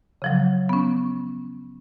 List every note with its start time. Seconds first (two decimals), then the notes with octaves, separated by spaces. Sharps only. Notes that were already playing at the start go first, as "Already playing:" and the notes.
0.22 C#3 F3 F#3
0.69 B3 C#4